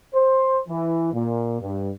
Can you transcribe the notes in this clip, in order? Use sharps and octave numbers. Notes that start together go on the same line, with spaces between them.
C5
E3
A#2
G2